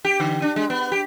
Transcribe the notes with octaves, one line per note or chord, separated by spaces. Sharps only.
G4
D3
D4
G#3
B3
G4